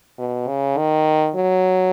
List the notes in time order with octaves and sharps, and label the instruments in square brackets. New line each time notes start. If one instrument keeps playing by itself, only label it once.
[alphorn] B2
C#3
D#3
F#3